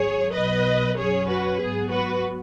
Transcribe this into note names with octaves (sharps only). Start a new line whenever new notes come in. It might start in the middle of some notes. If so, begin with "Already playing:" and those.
Already playing: G#1 G#2 F#3 G#4 C#5
B1 B2 F#3 B3 B4 D#5
F#2 F#3 C#4 G#4 C#5
F#4 B4
G#2 F#3 B3 G#4
F#4 B4